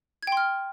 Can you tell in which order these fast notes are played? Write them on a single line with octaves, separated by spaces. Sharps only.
G#6 G5 C6 F6